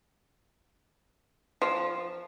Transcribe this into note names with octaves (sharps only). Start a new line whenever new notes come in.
F3